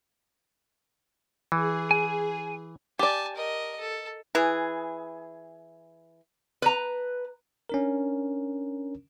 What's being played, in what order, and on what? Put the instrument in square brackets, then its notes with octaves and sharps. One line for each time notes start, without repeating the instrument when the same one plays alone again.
[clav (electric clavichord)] E3 [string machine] G#4
[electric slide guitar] G#5
[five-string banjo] G4 D5 [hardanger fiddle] G#5 A5
[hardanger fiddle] A#4 D#5
A4
[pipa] E3 G#4
[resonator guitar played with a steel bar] B4 A#5
[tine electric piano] C#4 D4 A#4